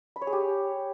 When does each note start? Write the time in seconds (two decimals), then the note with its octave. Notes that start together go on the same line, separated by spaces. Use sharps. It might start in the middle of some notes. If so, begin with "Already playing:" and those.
0.16 B5
0.21 C#5
0.27 G#4
0.33 G4